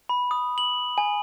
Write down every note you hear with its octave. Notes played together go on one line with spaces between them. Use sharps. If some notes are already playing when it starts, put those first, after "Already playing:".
B5
D#6
F#7
G#5